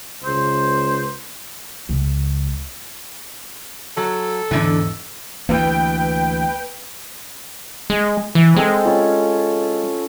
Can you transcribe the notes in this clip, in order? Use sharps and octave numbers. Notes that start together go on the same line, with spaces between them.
C#2 C5
C#2
F#3 A4
E2 G#2 D3 E3
D2 E3 A#3 B4 G5
G#3
E3
G#3 C4 A4 C5
C#4 F4